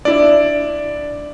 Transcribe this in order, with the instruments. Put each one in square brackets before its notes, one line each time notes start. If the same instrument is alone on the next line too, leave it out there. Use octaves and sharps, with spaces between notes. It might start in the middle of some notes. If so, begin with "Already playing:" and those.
[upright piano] D4 E4 [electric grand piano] D5